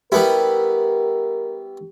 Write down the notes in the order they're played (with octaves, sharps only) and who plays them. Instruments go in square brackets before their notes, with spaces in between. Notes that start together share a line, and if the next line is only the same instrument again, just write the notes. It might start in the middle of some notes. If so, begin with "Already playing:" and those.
[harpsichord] G3 B3 E4 [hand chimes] G4 [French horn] A#4